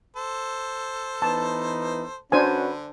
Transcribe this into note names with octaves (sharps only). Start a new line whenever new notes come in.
A4 C5
E3 B3 D#4 A5
D3 C#4 D4 F#4 B4 C5 G#5